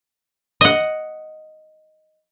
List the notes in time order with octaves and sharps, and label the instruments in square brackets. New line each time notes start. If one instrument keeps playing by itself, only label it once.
[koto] D#5 F#5